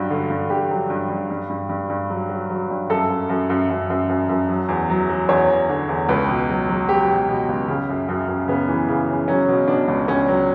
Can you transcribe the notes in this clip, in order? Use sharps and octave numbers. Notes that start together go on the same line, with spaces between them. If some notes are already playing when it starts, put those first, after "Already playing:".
Already playing: G2 F#3 F#4
D3
G2
G2 G4
F#3
G2
G2
G2
G2
G2
G2
F#3
F#3
F#3
G2
F#2 A4
F#2
F#2
F#2
F#2
F#2
F#2
F#2
F#3
E2
F#3
F#3
E2 C#5
E2
D3
E2
C#2 B4
B2
F#3
F#3
F#3 G4
B2
B2
C#2
C#3
F#2
F#2
F#2
C#3 B3
E3
C#3
C#3
F#3 C#4
B2
B2 D4
C#2
C#2 C#4
F#3